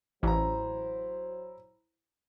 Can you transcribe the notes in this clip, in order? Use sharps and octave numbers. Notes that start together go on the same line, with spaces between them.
A1 F#3 E4 C5 A#5